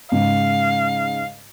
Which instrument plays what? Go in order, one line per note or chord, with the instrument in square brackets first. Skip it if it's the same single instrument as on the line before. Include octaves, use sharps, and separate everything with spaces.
[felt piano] G#2 C#3 [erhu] F5